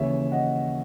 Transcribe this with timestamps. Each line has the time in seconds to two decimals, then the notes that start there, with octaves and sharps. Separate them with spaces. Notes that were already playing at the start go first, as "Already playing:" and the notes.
Already playing: D#2 C#3 E3 C#5 E5
0.32 D#5 F#5